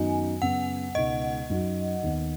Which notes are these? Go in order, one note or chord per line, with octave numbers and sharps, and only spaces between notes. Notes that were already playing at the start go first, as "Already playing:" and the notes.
Already playing: F#2 D#3 B3 D#4 F#4 G#5
F#2 C#3 B3 F#5
C#2 B2 G#3 B3 D#4 D#5
F#2 F#3 D#4 F#4
D#2 D#3 B3